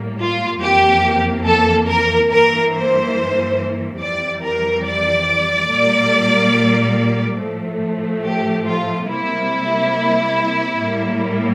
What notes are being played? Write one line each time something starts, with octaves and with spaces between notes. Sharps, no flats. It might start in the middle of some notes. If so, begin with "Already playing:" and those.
Already playing: A2 G3 A#3
F4
F2 E3 A#3 G4
A4
A#4
G2 E3 A#3 A#4
C5
F2 E3 G3 D5
A#4
D5
A#2 G3 A#3
A2 F3 A3
G4
F4
C3 G3 A#3 E4
A2 G3 A#3